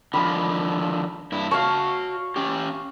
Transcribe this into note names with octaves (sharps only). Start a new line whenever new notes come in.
D3 D#3 F3 B5
G2 E4
F#4 C#5 F5 A5
C#4 G4